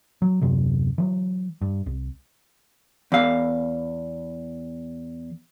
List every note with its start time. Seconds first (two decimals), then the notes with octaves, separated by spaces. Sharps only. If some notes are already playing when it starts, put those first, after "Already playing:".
0.22 F#3
0.42 D#1 F#2 C3 F#3
0.98 E3 F#3
1.62 G2
1.86 C2
3.12 E2 F5